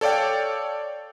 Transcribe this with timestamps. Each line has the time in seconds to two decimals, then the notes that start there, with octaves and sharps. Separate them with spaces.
0.01 A4 C#5 D5 F5 G5